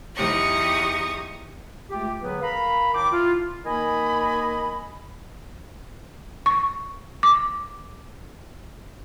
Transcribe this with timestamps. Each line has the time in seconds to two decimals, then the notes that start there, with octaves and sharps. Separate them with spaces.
0.15 E2 D#4 G4 C#6 D#6
1.90 C#2 A3 F4 G4
2.21 D3 F#3 B3 G#4 B4
2.41 A#4 F5 A#5 B5
2.94 A2 D#3 G5 A5 D6
3.11 E4 F4
3.65 D#3 A#3 D#5 G#5 B5
6.46 C#6
7.23 D6